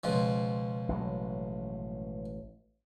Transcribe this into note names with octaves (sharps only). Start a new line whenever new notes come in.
C#2 B2 F3
A1 F#3